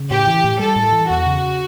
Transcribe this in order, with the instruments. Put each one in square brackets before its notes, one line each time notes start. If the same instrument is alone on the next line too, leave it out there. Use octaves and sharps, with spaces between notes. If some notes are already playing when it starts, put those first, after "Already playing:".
Already playing: [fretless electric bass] C#3
[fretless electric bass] A2 [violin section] G4
[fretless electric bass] E3
A2
[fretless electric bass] G3 [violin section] A4
[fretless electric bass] A2
E3
[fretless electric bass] E2 [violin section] F#4
[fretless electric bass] C#3